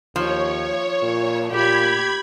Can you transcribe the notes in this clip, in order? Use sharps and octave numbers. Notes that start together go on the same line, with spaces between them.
D#2 F3 C#5
A#2
A#2 G4 B5 G#6